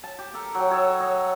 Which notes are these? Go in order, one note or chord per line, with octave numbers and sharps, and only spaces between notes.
A5
G4
G4 A4 A#4
F#3 G5
A4 C#5 D#5
C#5 D#5